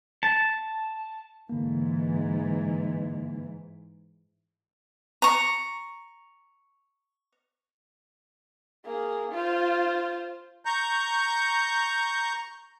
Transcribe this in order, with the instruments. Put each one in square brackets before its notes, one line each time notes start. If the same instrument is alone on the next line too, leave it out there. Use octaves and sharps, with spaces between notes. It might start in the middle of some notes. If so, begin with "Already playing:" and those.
[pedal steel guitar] A5
[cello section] G#2 E3 [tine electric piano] D3 A#3
[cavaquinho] A#5 C#6
[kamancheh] A#3 G#4
F4 C5
[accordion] A#5 C#6 G6